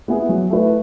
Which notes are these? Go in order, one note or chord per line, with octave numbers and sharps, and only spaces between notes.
B3 E4 G#4
F#3
A3 E4 B4